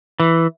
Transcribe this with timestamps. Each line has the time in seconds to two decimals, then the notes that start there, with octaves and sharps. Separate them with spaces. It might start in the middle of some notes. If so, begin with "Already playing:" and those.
0.20 E3